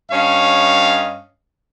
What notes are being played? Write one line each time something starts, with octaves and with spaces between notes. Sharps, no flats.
G2 C#4 C#5 D#5 F5